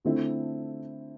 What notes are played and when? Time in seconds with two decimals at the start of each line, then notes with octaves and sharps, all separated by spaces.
0.05 D3 A3 C4 E4